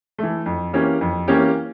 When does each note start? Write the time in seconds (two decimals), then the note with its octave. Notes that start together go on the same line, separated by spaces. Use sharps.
0.18 E3 A3
0.46 F2
0.73 E3 A#3 C#4 G4
1.01 F2
1.28 E3 A#3 C#4 G4